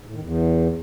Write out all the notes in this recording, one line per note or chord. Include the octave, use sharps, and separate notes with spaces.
G#2
A2
D#3
E2